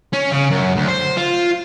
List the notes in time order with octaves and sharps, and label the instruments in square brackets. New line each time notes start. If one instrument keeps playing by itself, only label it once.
[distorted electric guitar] C#4
C#3
F#2
D2
C5
F4